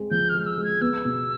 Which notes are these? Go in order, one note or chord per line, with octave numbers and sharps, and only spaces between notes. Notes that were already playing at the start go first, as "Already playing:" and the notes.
Already playing: G#3 C4
F3 G6
F6
G#3
E6
G#3
G#6
B3 E6
B2